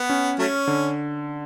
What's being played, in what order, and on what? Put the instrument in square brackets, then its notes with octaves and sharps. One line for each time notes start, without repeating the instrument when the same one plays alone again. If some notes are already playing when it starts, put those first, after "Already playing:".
Already playing: [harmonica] B3
[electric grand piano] C#4
[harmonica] F#3 A3 C#4
[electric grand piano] D3